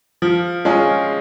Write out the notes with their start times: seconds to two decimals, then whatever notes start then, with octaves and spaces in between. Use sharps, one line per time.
0.22 F3
0.65 G#3 C#4 F4 G#4